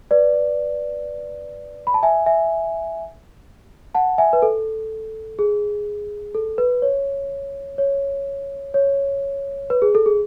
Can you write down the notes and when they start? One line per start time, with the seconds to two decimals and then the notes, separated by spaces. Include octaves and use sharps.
0.11 B4 D5
1.87 B5
1.94 A5
2.03 E5 G#5
2.26 E5 G#5
3.95 F#5 A5
4.18 E5 G#5
4.33 B4
4.42 A4
5.39 G#4
6.35 A4
6.58 B4
6.82 C#5
7.78 C#5
8.74 C#5
9.70 B4
9.82 G#4
9.95 A4
10.06 G#4